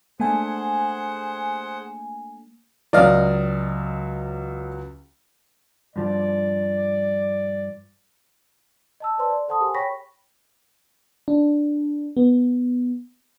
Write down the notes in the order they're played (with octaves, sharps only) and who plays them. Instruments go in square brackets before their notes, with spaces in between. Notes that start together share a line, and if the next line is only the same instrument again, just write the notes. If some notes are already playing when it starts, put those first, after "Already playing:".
[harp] A3 D4 [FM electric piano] A#3 G#5 [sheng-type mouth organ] G#4 C5 F#5
[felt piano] C#2 F#3 [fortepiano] D5 D#5 F5
[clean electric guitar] G2 F3 [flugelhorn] D5
[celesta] D#5 A5 E6
B4 C5 D5 A5 C6
D5
A4 C5 F#5 A5 C6 D#6
G4 G#4 A#4 C5 F#5 G#5
C#5 G5 B5 C#6 A#6 B6
[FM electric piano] D4
B3